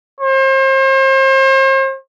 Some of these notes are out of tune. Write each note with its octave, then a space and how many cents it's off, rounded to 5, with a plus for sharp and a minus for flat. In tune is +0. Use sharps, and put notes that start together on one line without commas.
C5 +40